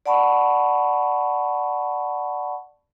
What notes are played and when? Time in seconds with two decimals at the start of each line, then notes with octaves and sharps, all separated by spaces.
0.06 D5 F#5 A5 B5 C#6